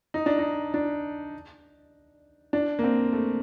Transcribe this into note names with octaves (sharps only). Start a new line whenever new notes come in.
D#4
D4
D#4
D4
D4
A#3
C4
A3